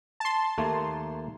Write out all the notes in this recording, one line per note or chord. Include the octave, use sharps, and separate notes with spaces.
A5 C6
D#2 A3 A#3